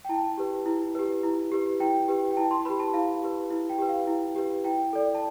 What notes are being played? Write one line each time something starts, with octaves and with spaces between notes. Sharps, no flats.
G5
E4 A5
G4 B4
E4
G4 B4
E4
G4 B4
E4 G5
G4 B4
G5
E4 A5
C6
G4 B4 B5
A5
E4 F5
G4 B4
E4
G5
G4 B4
F5
E4
G4 B4
E4 G5
A4 D5
A5